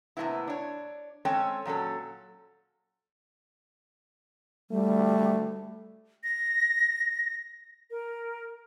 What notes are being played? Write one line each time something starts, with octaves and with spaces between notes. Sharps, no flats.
A2 C3 F3 A#3 B3 E4
D4 C#5
G#3 C4 C#4 A4 C#5 G5
A#2 F#3 C#4 A4
G3 A3
A#6
A#4